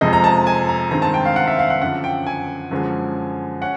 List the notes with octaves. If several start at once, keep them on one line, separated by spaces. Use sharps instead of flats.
F2 C3 F3 G#3 D#5
A#5
A5
G#5
A#5
G2 D#3 G#3 C4 A#5
A5
G5
F5
F#5
E5
F5
F#5
F#2 D3 F3 F#5
G5
G#5
F#2 D3 F3 G#3
C#4 F#5